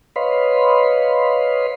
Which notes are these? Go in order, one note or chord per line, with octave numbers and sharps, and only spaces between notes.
B4 C#5 D#5 F5 B5 C6